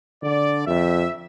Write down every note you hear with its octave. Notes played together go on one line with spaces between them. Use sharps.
D3 D5
F2 E5